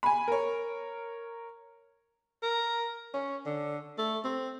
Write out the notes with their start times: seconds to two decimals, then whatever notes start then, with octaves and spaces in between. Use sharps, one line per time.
0.03 G#5 B5
0.28 A#4 C#5
2.43 A#4
3.14 C#4
3.46 D3
3.98 A3
4.24 C4